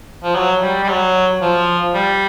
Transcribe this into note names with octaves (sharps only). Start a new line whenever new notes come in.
F3
F#3
G3
G3
F#3
F3
G3